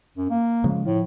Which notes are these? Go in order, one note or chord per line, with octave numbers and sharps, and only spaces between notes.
F#2
A#3
C#3 F3 G#3
A2 F3